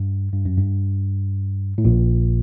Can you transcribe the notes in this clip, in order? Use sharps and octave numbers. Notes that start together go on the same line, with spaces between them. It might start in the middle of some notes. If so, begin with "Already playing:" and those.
Already playing: G2
G2
F#2
G2
A2
A#1 A#2